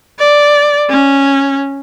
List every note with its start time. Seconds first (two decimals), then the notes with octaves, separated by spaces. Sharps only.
0.19 D5
0.90 C#4